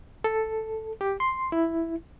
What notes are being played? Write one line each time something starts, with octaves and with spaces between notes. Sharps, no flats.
A4
G4
C6
E4